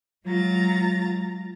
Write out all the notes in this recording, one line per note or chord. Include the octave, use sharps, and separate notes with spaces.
F#3 G#3 F4 A#5 A6